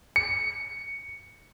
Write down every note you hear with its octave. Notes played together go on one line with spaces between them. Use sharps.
C#7